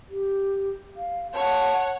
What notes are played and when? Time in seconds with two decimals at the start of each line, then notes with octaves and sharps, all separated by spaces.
0.10 G4
0.97 F5
1.34 C#5 F#5 A5